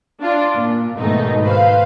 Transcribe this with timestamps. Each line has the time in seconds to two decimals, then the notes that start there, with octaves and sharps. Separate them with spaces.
0.21 D4 F4 D5
0.56 A#2
0.98 G#2 B2 D#3 A3 D#4
1.42 B4 C5 F5